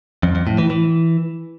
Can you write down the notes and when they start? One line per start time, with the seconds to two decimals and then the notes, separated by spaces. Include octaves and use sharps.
0.23 F2
0.35 F2
0.47 A2
0.58 E3
0.70 E3